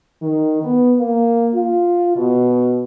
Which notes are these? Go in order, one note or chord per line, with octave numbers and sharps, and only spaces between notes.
D#3
B3
A#3
F4
B2